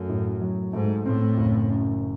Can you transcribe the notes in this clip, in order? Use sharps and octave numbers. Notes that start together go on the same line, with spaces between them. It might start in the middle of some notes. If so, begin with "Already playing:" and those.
Already playing: F#2 A3
A2
F#3
G#2 A3
A2 C4
F#1
F#2